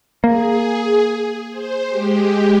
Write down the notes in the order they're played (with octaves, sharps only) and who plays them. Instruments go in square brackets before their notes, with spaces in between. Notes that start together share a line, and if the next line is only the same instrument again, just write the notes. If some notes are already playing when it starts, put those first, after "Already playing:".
[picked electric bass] A#3 [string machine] G#4
[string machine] C5
G#3 G4